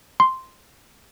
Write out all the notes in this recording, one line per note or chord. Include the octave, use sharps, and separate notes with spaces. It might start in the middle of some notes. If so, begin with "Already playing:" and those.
C6